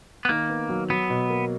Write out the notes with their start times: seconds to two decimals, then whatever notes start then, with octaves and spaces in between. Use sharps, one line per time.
0.25 B3
0.29 D#3 A#3
0.49 B3
0.69 F#3
0.90 F#3 B3
1.10 B2
1.30 A#3